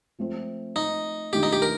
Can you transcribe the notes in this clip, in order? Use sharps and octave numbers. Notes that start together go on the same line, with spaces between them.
F3 A3 C4
D#4
D#3 A3 D4 F4 G4
D#4
G4
A#4